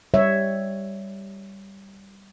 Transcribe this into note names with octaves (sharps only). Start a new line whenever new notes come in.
G3 C#5 E5